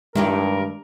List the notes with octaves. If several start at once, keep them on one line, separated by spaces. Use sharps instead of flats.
G2 D#3 G#3 E4 G4 A#4